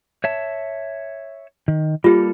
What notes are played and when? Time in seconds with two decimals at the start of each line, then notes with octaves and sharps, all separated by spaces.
0.24 C#5 E5 A5
1.68 D#3
2.04 G3 A#3 F4 G4 A4